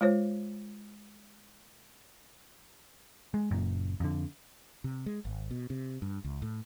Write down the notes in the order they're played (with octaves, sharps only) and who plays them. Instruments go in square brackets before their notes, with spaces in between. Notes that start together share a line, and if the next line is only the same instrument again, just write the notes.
[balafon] G#3 F4 C5 C#5
[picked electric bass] G#3
F#1 F#2 A#2
F2 D3
[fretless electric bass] C3
G#3
G#1
B2
C3
G2
C#2
A2